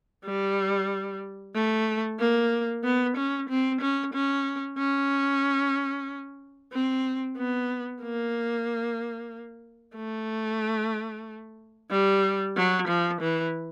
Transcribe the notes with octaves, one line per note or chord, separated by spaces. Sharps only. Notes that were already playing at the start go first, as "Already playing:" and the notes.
G3
A3
A#3
B3
C#4
C4
C#4
C#4
C#4
C4
B3
A#3
A3
G3
F#3
F3
E3